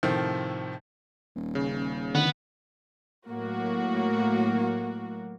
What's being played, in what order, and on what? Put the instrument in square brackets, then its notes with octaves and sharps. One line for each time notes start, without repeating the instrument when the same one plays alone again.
[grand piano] A2 C3 D#3 F3
[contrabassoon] D#1
[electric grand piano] C#3
[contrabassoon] A1 [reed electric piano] D3 D#3 [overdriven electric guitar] B3
[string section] A2 F#3 A#3 F#4